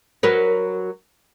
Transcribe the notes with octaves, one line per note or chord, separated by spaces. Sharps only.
F#3 A#4 B4